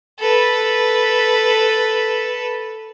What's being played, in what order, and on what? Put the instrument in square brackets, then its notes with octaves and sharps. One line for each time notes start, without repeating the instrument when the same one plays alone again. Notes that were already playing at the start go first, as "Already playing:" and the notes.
[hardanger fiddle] A4 B4